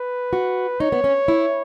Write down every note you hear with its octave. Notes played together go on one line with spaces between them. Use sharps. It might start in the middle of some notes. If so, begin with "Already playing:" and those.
Already playing: B4
F#4
D#4 C#5
B3
C#4
E4